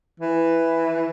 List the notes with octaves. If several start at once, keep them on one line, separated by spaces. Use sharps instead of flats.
E3